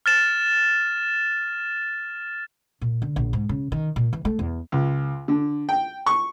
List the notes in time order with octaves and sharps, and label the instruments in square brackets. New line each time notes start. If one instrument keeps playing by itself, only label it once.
[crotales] F6 A6 E7
[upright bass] A#2
D3
A#1
G#2
C#3
D#3
A#2
E3
A3
E2
[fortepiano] C#2
D3
G5
C#6